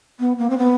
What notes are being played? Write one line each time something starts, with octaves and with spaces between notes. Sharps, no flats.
B3
A#3
C4
B3